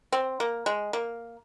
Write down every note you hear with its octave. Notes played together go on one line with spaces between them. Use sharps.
C4
A#3
G#3
A#3